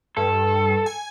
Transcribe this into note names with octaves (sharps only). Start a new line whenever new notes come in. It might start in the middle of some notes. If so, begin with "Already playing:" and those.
G2 A4
G#5